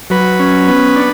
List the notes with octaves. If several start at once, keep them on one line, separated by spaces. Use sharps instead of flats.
F#3 B4
C#4
B3
D4